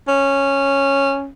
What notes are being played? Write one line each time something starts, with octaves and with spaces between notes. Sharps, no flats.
C#4